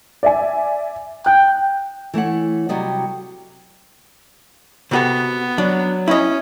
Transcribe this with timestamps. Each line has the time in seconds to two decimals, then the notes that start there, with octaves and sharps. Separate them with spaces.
0.23 D5 E5 G#5
1.26 G5 F#6
2.14 E3 A3 C#5 F#5
2.69 C3 F#3 G3 D5 D#5
4.91 C3 B3 F#4 A4
5.58 F#3 D4
6.08 C#4 E4 D#5